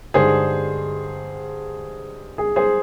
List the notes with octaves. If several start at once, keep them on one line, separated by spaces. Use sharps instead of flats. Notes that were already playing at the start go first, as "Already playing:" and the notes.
G2 D3 G#3 D#4 G#4 C5
G#4
G#4 C5